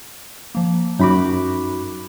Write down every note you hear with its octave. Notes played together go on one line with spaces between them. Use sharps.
F3 A#3
F#2 D#4 F#4 B5 D6